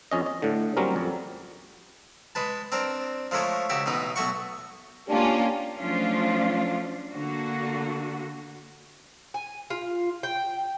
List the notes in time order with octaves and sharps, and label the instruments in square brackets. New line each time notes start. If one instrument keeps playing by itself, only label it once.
[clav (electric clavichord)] F2 C#4 D#5
D#5
A2 D3
F#3 G3 C4 C#4 A#4
F2
[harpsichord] G#3 B4 A5
C4 D4 A#4
F3 G#3 A3 A#4 C#5
C#2 F#4 G4 E5
A1 B2 D#4 B4
B1 A3 F#4 C#6
[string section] A#3 C#4 F4 [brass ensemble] D4 G4 D5
[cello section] F3 F#3 A3 C#4 D4 F4
D3 A#3 F#4
[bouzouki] G#5
F4
G5